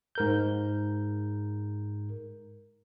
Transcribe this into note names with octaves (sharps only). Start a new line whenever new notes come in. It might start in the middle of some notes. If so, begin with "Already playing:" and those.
G#2 A#4 G6